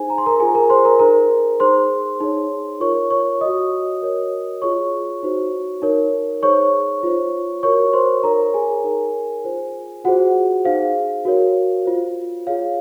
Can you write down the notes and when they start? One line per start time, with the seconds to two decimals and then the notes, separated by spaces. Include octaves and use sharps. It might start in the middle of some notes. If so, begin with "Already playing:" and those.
Already playing: D#4 G#4 C5 G#5
0.10 A#5
0.18 C6
0.26 A#4 A#5
0.40 F4 G#4 C5 G#5
0.54 A#4 A#5
0.70 C5 C6
0.85 A#4 A#5
0.99 D#4 G#4 A#4 C5 A#5
1.60 D#4 G#4 C5 C6
2.21 D#4 G#4 C#5
2.80 F4 A#4 C#5 C#6
3.11 C#5 C#6
3.41 F#4 C#5 D#5 D#6
4.02 F#4 A#4 C#5
4.62 F4 G#4 C#5 C#6
5.23 D#4 F#4 C5
5.82 D#4 A#4 C#5
6.42 D#4 G#4 C5 C#5 C#6
7.03 F4 C5
7.63 F#4 A#4 C#5 C#6
7.93 C5 C6
8.23 D#4 A#4 C#5 A#5
8.54 G#4 G#5
8.84 D#4 A#4 C#5
9.44 F4 C5
10.04 F4 F#4 G#4 C5 F#5
10.65 D#4 G#4 C5 F5
11.25 F#4 A#4 C#5
11.85 F4 C5
12.47 F4 G#4 C#5 F5